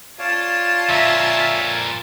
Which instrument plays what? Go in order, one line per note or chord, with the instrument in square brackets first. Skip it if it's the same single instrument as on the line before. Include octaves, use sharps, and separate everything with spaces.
[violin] F4 A5 [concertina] C#5 D5 F5
[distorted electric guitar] F2 A#2 [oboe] E5